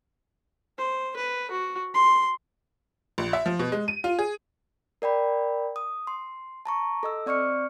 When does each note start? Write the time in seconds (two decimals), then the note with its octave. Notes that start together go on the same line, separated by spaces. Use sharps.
0.78 C5
1.17 B4
1.51 F#4
1.94 C6
3.18 A#1
3.33 E5
3.46 F3
3.59 B2
3.72 G#3
3.88 D#7
4.04 F4
4.19 G#4
5.02 A#4 D5 G5 B5
5.76 D#6
6.07 C6
6.65 A5 A#5 C#6
7.03 A4 D#5 E6
7.26 C4 D5 C#6 F6 C#7